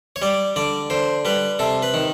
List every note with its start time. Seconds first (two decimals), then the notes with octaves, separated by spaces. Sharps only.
0.16 C#5
0.22 G3 D5
0.56 D3 D5
0.90 D3 C5
1.25 G3 B4
1.59 C3 A4
1.83 B4
1.94 D#3